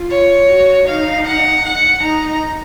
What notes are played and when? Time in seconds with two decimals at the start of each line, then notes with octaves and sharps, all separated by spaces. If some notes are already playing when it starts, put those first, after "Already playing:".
Already playing: F4
0.10 C#5
0.49 F#4
0.87 D#4 F5
1.26 F#5
1.65 F#5
2.02 D#4 A#5